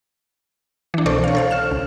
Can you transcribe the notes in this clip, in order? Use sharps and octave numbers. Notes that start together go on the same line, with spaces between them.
E3 D4
C2 B2 A4 C5 D5 C#6
C#5 F5
A4 C5 F5
F6 E7
C#2